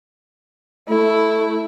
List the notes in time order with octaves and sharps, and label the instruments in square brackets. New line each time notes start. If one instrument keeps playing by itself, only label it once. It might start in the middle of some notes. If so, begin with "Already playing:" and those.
[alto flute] A3 [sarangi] E4